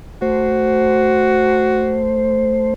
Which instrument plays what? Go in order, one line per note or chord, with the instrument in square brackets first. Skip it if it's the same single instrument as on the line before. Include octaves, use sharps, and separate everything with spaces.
[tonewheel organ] A3 C5 [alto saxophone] F#4